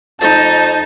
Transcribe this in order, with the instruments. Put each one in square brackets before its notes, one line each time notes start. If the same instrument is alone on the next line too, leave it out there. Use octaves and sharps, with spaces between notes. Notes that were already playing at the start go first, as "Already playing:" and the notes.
[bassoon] F2 [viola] D#4 [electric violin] A5 [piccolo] A6